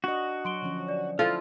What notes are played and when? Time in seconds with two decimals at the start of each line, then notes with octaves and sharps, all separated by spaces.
0.04 D4 F#4 D#5
0.45 F#3 C6 D7 G7
0.62 D3 F3 C#4
0.88 D5
1.19 F3 E4 F4 A4 F6